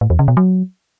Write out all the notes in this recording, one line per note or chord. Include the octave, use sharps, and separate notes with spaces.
A2
E2
C#3
B2
F#3